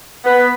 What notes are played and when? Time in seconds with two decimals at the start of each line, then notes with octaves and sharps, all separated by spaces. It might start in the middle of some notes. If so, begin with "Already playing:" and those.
0.24 B3